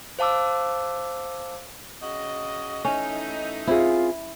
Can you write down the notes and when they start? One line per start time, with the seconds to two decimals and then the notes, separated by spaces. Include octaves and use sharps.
0.19 C5 F5 A5 D6 E6
2.02 C#3 F#4 D#5
2.85 E3 A3 C#4 D#4
3.67 C4 E4 F4 G#4